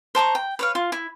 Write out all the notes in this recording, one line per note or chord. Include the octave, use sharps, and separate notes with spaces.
C5 A5 A#5 C#6
G5
B4 C#5 F5
F4
E4